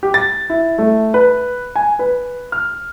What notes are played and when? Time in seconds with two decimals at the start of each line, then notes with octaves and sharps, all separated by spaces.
0.03 G4
0.14 A6
0.50 E4
0.78 A3
1.14 B4
1.76 G#5
1.99 B4
2.52 F6